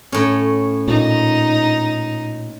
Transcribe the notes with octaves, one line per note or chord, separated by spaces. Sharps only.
A2 C#4
A#2 D#4